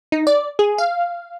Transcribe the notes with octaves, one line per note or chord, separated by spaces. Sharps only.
D#4
D5
G#4
F5